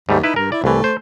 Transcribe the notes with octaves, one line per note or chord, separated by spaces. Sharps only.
D#2 G#2 G3 A3
D#4 E4 B4
G2 A#4
E4 D5
C2 E3 A3
C5